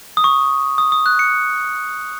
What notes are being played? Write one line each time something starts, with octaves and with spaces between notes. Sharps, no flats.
D#6
C#6
D#6
D#6
F#6
C#7